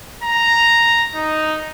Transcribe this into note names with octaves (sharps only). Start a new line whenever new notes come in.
A#5
D#4